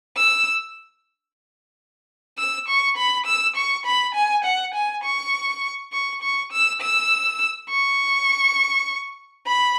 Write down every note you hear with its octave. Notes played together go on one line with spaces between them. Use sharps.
E6
E6
C#6
B5
E6
C#6
B5
G#5
F#5
G#5
C#6
C#6
C#6
E6
E6
C#6
B5